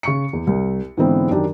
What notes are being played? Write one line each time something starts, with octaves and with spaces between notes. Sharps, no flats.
C#3 C#6 C#7
E2
C2
G#2 D3 E3 B3 C4
F#2 D#3 D4 G4